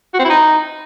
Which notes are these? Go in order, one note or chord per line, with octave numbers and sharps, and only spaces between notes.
F#4
C4
E4
D#4